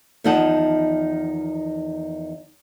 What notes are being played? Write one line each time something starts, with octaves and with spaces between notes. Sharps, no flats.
E2 D#3 F3 D#4 F#5 A5